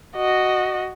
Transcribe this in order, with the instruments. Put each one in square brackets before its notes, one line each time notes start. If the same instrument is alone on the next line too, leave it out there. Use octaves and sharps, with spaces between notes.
[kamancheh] F#4 D#5